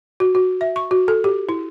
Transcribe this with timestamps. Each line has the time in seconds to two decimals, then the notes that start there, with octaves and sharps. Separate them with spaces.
0.20 F#4
0.35 F#4
0.61 E5
0.76 C#6
0.91 F#4
1.08 A4
1.24 G4
1.49 E4